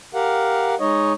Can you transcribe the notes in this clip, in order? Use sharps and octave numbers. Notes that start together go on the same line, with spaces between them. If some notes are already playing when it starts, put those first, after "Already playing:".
G4 A#4 F5 F#5
G#3 D#4 C#5 D#5